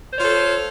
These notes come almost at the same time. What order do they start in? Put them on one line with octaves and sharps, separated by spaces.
C5 C#5 F4 A4